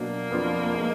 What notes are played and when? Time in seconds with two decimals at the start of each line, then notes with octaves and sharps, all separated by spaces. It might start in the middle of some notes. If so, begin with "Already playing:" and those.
Already playing: B2 F#3 A#3 D4
0.30 F2 F3 B3 D4 F4
0.73 G#3 D#4 A#4 D#5